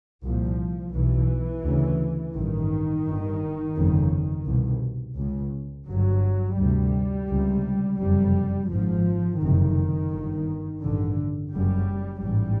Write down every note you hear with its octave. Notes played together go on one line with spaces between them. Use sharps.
C2 A#2 F3
B1 B2 E3
D2 C#3
A1 G2 D#3
G1 G2
G1 F2 C#3
C2 B2
C#2 C#3
G1 G2 F#3
D2 C3 G3
C#2 C3
F#1 F2 C3 G3
G#1 G#2 F3
F#1 F2 C3 D#3
G1 G2
A1 G2 D3
F#1 F#2 C#3 G3
A1 G#2 G3